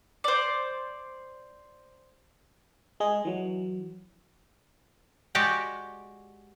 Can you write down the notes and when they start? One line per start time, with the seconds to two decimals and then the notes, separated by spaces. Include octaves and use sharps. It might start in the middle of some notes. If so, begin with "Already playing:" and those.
0.24 C5 D5
3.00 G#3 G#4 D#5
3.25 E3 F#3
5.35 G#3 F#4 G4 D5 G5